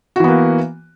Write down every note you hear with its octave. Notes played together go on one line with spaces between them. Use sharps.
E3 A#3 B3 F#4